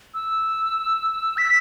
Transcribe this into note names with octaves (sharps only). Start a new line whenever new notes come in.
E6
B6